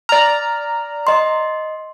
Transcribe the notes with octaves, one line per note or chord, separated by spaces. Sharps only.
D5 A#5 F6
D#5 C6